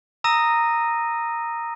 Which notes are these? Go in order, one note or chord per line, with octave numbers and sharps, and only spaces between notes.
A#5 D#6 E6 A#6 D#7